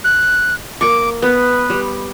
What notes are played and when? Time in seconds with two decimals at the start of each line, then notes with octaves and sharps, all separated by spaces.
0.04 F#6
0.81 A#3 C#6 D6
1.22 B3 B4
1.70 G3